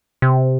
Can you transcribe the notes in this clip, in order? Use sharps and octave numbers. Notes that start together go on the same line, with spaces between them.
C3